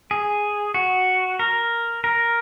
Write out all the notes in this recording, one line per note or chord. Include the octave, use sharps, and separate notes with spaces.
G#4
F#4
A#4
A#4